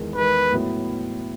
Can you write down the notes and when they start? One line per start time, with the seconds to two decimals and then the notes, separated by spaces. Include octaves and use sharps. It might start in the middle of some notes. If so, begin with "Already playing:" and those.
Already playing: E2 D#3 G#3
0.15 E2 D#3 G#3 B4
0.52 A2 F#3 B3 E4